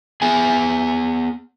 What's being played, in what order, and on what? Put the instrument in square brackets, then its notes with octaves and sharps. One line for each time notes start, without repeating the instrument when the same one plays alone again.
[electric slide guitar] B3 G#4 G#5